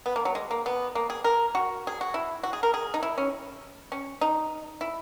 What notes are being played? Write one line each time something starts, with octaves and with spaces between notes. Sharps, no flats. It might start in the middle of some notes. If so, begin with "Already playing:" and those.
B3
A#3
F#3
G#3
A#3
B3
A#3
G#4
A#4
F#4
G#4
F#4
E4
F#4
G#4
A#4
G#4
D#4
E4
C#4
C#4
D#4
E4